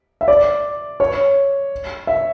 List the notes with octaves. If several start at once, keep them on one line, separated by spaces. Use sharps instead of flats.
E5
D5
C#5
E5